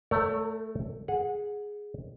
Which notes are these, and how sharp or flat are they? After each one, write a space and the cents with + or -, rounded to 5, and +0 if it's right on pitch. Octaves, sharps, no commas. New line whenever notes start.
A3 +0 A#4 -45 C#5 +40
G#4 +0 F#5 -20